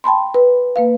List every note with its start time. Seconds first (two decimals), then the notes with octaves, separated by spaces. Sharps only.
0.04 G5 A5 B5 C6
0.34 B4
0.76 A#3 B4 F5